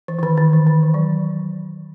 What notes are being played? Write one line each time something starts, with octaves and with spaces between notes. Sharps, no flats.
E3
E3
D#3
D#3
E3
D#3
E3
F#3